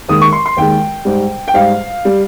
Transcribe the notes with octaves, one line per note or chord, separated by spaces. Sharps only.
D#2 D#3 G#3 D#6
C#6
C6
C6
D#2 D#3 G#3 G5
G#2 G3
G5
G#2 G3 F5
G3